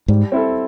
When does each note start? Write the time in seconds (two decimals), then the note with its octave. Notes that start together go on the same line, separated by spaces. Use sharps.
0.08 G#2 G3
0.32 C4 E4 A4